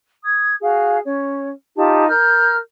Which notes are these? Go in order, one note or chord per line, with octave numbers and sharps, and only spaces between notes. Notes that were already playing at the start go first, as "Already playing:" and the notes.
D#6 G#6
F#4 G#4 F5
C#4 C#5
D#4 F4 G4 A5
A#4 F6 G6